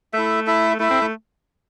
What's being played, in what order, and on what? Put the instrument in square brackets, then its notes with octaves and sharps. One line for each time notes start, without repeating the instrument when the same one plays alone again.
[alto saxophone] A3 [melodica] E4 A4 E5
[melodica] E4 A4 E5
[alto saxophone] A3 [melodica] E4 A4 E5
[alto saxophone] C4
A3